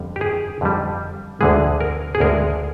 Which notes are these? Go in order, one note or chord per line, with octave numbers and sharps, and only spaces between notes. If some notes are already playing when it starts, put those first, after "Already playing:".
Already playing: F2 D3 G3
G4
G#4
F2 D3 G3
D2 D3 G#3 G#4
A#4
G#4
D2 D3 G#3 A#4